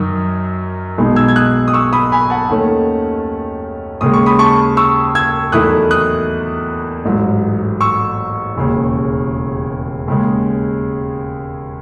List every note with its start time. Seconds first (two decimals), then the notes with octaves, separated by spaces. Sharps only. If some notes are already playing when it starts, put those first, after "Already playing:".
Already playing: F#2 D#3 F#3 D#6
0.98 B1 B2 G#3 B3 D#4
1.16 E6 G#6
1.28 G#6
1.36 D#6 F#6
1.68 D#6
1.73 C#6 E6
1.93 B5 D#6
2.12 G#5 B5
2.30 F#5 A5
2.50 D#2 D#3 A3 C#4
4.01 D#2 C#3 G#3 D#6
4.14 C#6
4.26 B5 D#6
4.39 A5 C#6
4.77 C#6 E6
5.15 E6 G#6
5.52 E2 D#3 F#3 A3 E4 D#6 F#6
5.91 D#6 F#6
7.05 A1 G#2 F#3
7.81 C#6 E6
8.56 E1 D#2 C#3
10.08 D#2 C#3 G#3